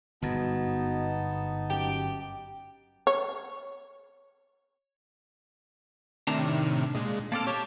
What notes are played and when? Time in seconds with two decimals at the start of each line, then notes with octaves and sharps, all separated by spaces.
0.22 G1 G#2 B2 B3 D#4 A5
1.70 F#2 G4
3.07 C#5
6.27 A2 C3 D#3 D4 A5 A#5
6.95 A#2 G#3
7.32 A#3 C4 A4 A5 D6 F6
7.47 G4 C#5 A5